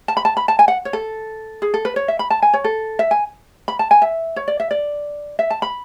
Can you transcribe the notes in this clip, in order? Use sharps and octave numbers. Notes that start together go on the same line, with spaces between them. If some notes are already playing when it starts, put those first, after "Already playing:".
A5
B5
A5
B5
A5
G#5
F#5
C#5
A4
G#4
A4
B4
C#5
E5
B5
A5
G#5
C#5
A4
E5
G#5
B5
A5
G#5
E5
C#5
D5
E5
D5
E5
A5
B5